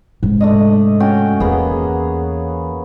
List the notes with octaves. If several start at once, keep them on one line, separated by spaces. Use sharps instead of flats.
G#2 C3
A3 D4 D#5
C#4 F#4 G5
E2 A#3 B3 G#4